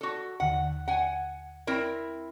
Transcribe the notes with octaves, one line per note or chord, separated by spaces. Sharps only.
F#4 A4
D#2 D3 F#5
F#5 G#5
C4 E4 A#4